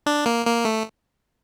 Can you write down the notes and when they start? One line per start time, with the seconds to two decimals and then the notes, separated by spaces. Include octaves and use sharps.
0.06 D4
0.26 A#3
0.46 A#3
0.65 A3